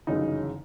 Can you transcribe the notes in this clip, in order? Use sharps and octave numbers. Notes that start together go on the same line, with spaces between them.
G1 F#2 C#3 E3 D#4